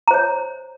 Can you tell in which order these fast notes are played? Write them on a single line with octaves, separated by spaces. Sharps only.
A#5 C5 C#5